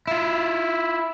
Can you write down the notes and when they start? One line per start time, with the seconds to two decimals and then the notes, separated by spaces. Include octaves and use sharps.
0.08 E4 F4